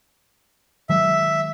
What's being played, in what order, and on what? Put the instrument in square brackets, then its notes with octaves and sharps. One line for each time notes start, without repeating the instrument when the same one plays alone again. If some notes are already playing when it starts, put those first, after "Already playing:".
[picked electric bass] D#3 F#3 G#3 [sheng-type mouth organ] E5